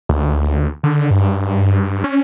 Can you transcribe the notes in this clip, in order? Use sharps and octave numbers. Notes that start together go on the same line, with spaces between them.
D2
D3
G2
C#4